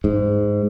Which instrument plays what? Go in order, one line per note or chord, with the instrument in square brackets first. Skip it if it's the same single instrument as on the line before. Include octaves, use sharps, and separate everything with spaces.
[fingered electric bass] G#2